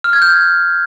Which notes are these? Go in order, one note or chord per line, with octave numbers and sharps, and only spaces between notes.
F6
G#6
G6